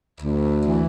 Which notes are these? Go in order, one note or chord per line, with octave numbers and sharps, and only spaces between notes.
D2
E3